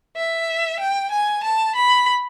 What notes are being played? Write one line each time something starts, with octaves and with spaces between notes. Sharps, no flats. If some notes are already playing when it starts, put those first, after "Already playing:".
E5
G5
G#5
A5
B5